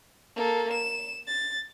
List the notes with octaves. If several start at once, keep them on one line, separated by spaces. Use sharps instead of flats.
A#3 A4
E7
A6